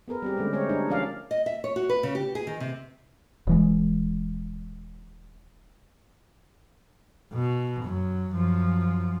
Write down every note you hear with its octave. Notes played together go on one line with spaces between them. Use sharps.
B3 G#4 A#4 B4
G3 C4 G4
D3 G#3 A3 C#4
G#4 C5 C#5
D4 D#4 G4
F3 C#4 A#4 D5 F5
D#5
E5
C#5
F#4
B4
C#3
G4
G#4
D#3
C3
D#1 E3 G#3
B2
F#2 F#3
F#2 F3